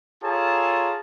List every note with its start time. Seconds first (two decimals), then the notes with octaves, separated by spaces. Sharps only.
0.23 F4 G#4 A4 C#5 A5 A#5